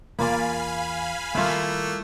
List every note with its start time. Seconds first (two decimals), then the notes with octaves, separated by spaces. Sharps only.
0.19 E2 A#3 F4 D5 F5 G#5 B5
1.35 D#3 G3 A3 A#3 E4 F4